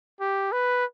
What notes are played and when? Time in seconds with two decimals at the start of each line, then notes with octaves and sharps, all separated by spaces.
0.21 G4
0.52 B4